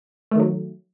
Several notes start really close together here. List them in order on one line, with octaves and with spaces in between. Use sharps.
A3 D#3 F#3